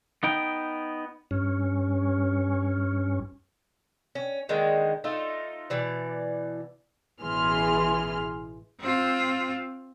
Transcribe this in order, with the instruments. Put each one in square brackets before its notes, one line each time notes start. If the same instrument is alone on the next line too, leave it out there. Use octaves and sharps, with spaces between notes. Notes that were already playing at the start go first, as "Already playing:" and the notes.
[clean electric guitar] B3 D#4 G5
[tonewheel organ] G2 C#4
[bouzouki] C#4
D3 D#3 G#3 A#3
A3 D#4 F4
B2 E3 D5
[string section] A1 B2 E3 G#4 C6 F6
[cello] C4 F4